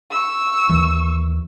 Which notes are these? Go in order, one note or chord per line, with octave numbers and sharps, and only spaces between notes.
C#6 E6
D#2 E3